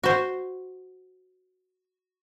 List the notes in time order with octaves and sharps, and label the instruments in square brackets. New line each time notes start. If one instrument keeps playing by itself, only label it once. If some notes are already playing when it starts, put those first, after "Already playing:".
[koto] F#4 C5